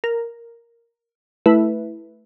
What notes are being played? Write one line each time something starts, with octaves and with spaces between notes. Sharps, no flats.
A#4
A3 E4 B4 E5